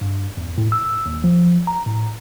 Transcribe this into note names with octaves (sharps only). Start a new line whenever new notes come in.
G2
E2
A2
E6
D#2
F3
A#5
A2